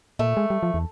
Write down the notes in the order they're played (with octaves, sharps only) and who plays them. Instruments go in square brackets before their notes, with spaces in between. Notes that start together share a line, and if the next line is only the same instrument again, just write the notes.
[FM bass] A#2 [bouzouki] A3
[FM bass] G#3
G3
F3
E2